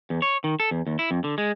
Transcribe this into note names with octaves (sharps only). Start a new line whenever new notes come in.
E2
C#5
D#3
A4
E2
D#2
E4
F2
D3
G#3